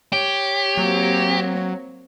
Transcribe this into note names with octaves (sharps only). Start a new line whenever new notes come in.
G4 C#5
F#3 A#3 C4